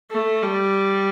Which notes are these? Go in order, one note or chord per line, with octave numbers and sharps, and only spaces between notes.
A3
G3